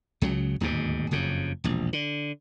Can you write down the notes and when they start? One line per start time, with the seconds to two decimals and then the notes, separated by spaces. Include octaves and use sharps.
0.22 C#2 C#3 F#3
0.60 D1 D#2 G#2 B2
1.11 F#1 F2 C#3
1.64 E1 A#1
1.93 D3